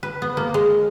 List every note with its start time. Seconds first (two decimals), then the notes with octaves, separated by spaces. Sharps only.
0.03 B4
0.22 B3
0.37 A#3
0.54 G#3